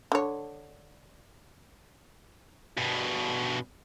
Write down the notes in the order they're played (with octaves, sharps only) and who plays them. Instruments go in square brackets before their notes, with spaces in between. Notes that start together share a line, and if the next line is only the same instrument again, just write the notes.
[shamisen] D3 C#5
[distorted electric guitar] G2 B2